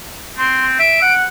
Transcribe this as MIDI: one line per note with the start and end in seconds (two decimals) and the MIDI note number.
0.38 0.79 60
0.38 0.65 84
0.79 1.00 76
0.79 1.13 98
1.02 1.25 78